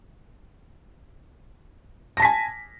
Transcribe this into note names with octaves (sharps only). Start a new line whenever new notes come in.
G#5 A5 A#6 B6